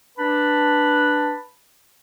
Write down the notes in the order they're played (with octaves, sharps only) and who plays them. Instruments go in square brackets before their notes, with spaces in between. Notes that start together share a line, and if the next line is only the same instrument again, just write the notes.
[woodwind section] D4 B4 A5 B5